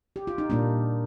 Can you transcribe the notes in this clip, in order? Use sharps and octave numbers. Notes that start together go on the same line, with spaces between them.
G4
F4
D#4
A#2 G3 A#3 D4